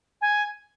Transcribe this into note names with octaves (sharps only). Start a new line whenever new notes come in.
G#5